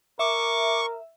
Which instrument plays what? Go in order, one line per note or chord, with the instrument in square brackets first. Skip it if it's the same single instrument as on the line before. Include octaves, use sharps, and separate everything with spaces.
[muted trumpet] A#4 [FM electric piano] E5 [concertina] C#6 [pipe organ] D6